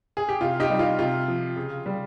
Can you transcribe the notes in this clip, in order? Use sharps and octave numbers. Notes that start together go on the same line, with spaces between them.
G#4
G4
C3 F4
D#4 G4
G3
F4
C3 F4
F3
C#3
G3